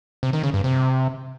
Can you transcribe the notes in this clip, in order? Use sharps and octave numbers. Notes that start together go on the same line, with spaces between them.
C3
D#3
C#3
G2
C3